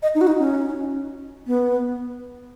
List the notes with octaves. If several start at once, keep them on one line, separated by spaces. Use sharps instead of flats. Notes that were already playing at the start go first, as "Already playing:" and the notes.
D#5
D#4
F#4
D#4
C#4
B3